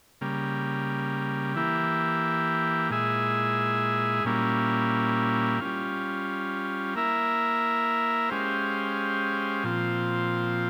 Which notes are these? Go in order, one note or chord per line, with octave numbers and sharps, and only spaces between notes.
C#3 G3 A#3
E3 A#3 E4 G4
A#2 G#3 E4 G#4 E5
A#2 G3 A#3 C#4 E4
G3 C#4 F4
A#3 E4 A#4 E5
G#3 C#4 G4 C5 F5
A#2 F3 C4 F4